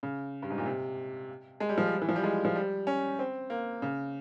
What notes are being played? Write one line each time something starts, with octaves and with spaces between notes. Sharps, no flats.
C#3
G2
G#2
A#2
C3
G#3
G3
F3
G3
E3
F3
G3
G#3
F3
G3
C#4
C4
A#3
C#3